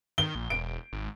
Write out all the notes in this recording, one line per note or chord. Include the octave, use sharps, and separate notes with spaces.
D#3 G7
A#1
E1 D7
G#1